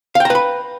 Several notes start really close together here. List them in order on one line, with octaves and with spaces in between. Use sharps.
F5 G5 A#5 B4 B5